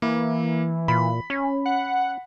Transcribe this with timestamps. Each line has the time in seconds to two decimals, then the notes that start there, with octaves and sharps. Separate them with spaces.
0.02 E3 A#3
0.88 A#2 B5
1.30 C#4
1.65 F#5